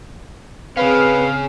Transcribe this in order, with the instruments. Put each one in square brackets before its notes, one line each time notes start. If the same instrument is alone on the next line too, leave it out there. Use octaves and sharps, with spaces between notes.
[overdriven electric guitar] C#3 C#4 [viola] C4 G#4 [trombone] B4 [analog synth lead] F5